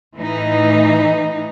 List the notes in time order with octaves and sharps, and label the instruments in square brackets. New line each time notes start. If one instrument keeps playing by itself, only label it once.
[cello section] A2 E3 D#4